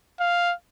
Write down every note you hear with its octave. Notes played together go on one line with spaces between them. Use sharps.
F5